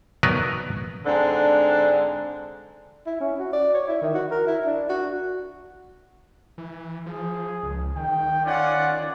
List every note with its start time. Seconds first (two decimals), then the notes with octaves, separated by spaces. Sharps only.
0.23 F#3 B3 D#4 A#4 B4 D5
1.06 G#2 D3 C4 D4
3.07 E4
3.20 C#4
3.39 F#4
3.53 D5
3.74 C#5
3.88 E4
4.02 D#3
4.14 F#4
4.31 A#4
4.47 E4
4.65 D4
4.90 F#4
6.58 E3
7.06 F3 G#4
7.63 C#2
7.96 D#3 G5
8.45 C#4 F4 D5 F#5